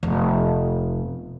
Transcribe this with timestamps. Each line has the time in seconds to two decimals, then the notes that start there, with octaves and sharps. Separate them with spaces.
0.03 F1 B3